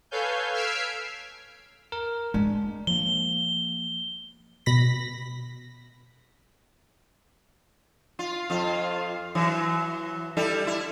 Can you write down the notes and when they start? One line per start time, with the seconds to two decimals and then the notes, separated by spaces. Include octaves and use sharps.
0.11 A4 B4 C#5 F5 G#5 G6
0.53 E6 F6 G#6 B6 C7 D7
1.92 A#4
2.34 G#3 D4
2.87 F3 A#3 G7
4.66 B2 B5 A#6 B6
8.19 F4
8.50 F2 F4
9.35 E3 F#3
10.37 G3 E4 A4
10.67 E4